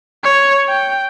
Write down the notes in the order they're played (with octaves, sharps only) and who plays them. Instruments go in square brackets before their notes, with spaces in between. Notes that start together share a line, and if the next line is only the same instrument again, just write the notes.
[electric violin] C#5
G5